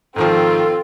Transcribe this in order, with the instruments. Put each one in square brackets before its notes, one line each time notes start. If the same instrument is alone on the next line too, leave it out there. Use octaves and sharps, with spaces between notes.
[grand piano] G#2 D#3 F3 [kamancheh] C4 F4 [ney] A4